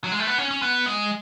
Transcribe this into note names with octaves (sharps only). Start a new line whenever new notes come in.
F#3
G#3
A3
B3
C#4
C#4
B3
G#3